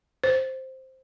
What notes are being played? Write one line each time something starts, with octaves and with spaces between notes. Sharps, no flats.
C5